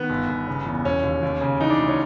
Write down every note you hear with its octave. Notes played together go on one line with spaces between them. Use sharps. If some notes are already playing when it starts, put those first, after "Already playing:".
Already playing: D#3 B3
G1
G1
C#3
E2
E1 C#4
D#2
D#2
C#3
E3 D#4
D4
D2
C#4